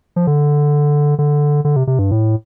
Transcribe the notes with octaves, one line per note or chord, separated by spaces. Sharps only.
F3
D3
D3
D3
C3
C3
G2
A2